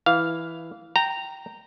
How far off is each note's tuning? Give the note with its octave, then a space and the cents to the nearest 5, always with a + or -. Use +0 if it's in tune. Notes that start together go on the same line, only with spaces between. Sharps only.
E3 +0 F5 +0
G5 -10 A#5 -10